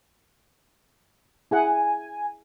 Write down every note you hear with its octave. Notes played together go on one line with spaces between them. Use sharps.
E4 G#4 F#5 G#5